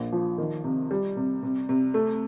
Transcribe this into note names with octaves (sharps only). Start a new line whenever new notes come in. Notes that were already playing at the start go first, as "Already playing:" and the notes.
Already playing: A#1
F3
D#3
C3
G3
C3
C3
C3
A3